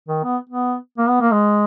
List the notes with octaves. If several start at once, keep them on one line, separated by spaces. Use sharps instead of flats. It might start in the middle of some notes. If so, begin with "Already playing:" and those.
D#3
B3
B3
A#3
B3
A#3
G#3